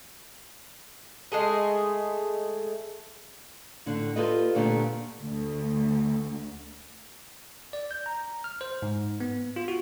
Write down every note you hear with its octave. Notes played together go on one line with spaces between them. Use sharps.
G#3 A3 G#4
A2 D3 D4
F4 G4 A4 B4 D5 D#5
A#2 D3 A3 B3 D4 G4
D2
D5
G6
A#5
F6
C5
G#2
B3
F4
F#4